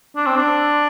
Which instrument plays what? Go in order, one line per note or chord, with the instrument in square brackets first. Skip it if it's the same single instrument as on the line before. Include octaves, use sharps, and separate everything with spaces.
[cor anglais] D4
C4
D4